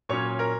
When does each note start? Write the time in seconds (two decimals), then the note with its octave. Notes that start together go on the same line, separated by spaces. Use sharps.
0.09 A#2 F#3 C#4 C#5
0.39 A#4